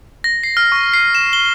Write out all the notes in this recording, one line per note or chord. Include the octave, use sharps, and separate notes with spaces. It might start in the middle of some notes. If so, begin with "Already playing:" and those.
A#6
C7
F6
C#6
C7
E7
G7